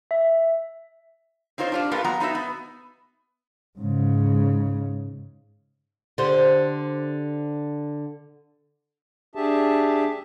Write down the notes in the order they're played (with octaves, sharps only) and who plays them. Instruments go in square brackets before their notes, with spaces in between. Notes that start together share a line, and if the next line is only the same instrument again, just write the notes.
[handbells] E5
[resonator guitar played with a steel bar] C4 D#4 F4 C5 C#5
D4 F4 G4
A3 A#3 F4 G4 A#4 B4
F#3 B3 F#5 A#5
B3 D#4 F#4 D#5 E5
B3
[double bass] G#2 C#3
[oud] D3 G4 C5
[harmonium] D4 G4 G#4 E5 A5